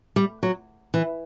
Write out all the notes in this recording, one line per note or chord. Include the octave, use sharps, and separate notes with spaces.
G3
F#3
E3